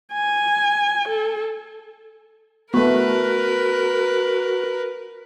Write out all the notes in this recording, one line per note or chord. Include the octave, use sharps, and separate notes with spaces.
G#5
A4
A3 B3 F#4 A#4 B4